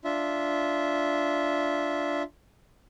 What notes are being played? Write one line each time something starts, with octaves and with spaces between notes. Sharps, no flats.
D4 F4 E5